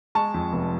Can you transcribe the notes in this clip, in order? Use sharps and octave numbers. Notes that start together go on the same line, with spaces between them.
G#3 A5 C#6
F2
F1